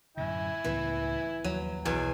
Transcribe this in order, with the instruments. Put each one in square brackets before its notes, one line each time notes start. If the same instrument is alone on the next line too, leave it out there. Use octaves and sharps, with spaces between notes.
[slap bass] F#2 A2 D3 [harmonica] E4 G#5
[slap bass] C#2 A2 B3 [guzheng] E3
[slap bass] D#2 F3 [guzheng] F#3
[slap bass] B1 [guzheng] E2 B2 [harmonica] G#5